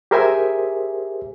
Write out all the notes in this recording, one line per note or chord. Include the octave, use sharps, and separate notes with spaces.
G4 G#4 A#4 C5 E5 G#5